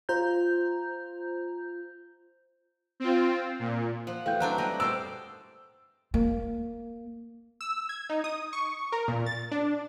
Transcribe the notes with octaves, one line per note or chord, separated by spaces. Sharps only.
F4 C5 A#5 G6
C4 F4
A#2
F3 F#5
E3 A3 F#4 F5 G5 G6
F#3 C4 D4 A5 A#5 F#6
G3 B4 C#5 D#5
A3 C5 D5 F5 G5 E6
A#3
E6
G#6
D#4
D#6
C#6
A#4
A#2
A6
D4